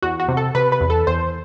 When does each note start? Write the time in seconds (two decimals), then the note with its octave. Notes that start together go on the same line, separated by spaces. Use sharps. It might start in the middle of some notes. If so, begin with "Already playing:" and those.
0.02 E2 F#4
0.20 F#4
0.28 C3
0.37 A4
0.55 C3 B4
0.72 B4
0.81 E2
0.90 A4
1.07 E2 C5